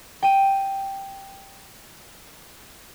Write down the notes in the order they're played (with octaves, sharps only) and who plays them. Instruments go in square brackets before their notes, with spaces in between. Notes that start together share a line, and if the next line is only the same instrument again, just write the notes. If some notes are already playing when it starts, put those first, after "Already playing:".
[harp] G5 D#7